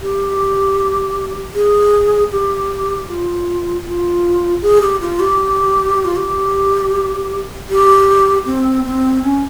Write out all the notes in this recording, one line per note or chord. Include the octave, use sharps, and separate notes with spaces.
G4
G#4
G4
F4
F4
G#4
G4
F4
G4
F4
G4
G4
C4
C4
C#4